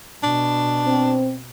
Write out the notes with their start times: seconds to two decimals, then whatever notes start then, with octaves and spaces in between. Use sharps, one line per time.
0.23 B2 D4
0.85 C4